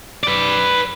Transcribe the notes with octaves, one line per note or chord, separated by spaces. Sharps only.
B4 D5